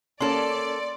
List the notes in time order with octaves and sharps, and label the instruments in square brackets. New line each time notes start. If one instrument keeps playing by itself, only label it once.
[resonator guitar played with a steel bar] A#3 A4 [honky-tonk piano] C#4 [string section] D5 [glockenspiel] C6